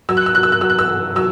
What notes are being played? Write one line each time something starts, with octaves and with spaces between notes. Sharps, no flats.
F#3 E6
F#6
E6
F#3 F#6
E6
F#6
F#3 E6
F#6
E6
F#3
F#3 E6